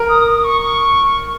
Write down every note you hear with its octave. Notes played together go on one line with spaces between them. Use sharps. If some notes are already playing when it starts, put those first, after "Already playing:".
Already playing: A#4
D#6
D#6
C#6
C#6